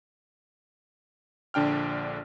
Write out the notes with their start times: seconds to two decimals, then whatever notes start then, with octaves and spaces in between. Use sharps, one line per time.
1.54 A#1 D3 D4 G5 F6